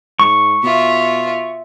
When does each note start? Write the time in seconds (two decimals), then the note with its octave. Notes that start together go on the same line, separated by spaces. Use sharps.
0.20 G#2 C#6
0.64 B2 F4 E5